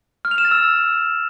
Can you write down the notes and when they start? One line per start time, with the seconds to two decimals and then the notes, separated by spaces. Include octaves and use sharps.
0.25 F6
0.31 F7
0.38 E7
0.45 A6
0.51 E6